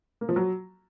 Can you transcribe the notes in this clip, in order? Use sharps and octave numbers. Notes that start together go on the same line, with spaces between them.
A#3
F3
F#3